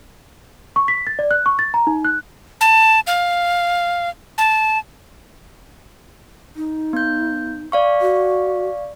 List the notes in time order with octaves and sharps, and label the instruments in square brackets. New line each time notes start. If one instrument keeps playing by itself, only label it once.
[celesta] C#6
B6
A6
D5
F#6
C#6
A6
A#5
D#4
F#6
[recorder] A5
F5
A5
[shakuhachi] D#4
[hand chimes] B3 G6
D5 F5 C#6
[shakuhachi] F#4